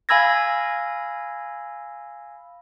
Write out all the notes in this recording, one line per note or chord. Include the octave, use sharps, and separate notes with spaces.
F5 G#5 B5 E6 G#6 A#6